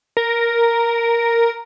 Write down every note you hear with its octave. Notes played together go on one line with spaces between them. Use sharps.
A#4